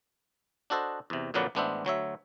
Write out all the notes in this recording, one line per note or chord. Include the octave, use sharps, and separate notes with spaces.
D4 F#4 A4 C5 D#5
E2 C3
F2 A#2 D3 F#3 B4 D5
A1 G#3 B3 D4 C5 E5
D2 F#3 C#5 E5